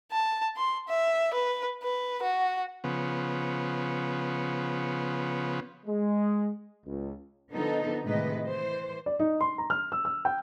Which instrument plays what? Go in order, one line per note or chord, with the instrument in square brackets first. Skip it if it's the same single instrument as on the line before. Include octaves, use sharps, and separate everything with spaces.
[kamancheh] A5
C6
E5
B4
B4
F#4
[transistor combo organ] C#3 F3 B3
[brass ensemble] G#3
C#2
[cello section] D3 F3 B3 D#4 A4
A2 C3 D#3 G#3 B4 D#5
E3 C5
[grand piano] D5
D#4
C6
A#5
F6
E6
E6
G5